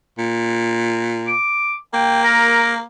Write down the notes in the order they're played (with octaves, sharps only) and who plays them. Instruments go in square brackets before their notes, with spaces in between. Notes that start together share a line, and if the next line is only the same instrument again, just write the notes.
[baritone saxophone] A#2
[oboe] D6
[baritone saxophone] A#3 [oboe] G5
[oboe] A#4